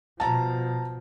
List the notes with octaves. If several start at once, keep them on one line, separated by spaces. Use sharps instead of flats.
B2 F3 A5 A#5